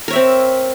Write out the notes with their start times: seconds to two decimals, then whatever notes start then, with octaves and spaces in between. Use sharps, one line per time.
0.08 A#4
0.10 C#5
0.13 E5
0.15 C4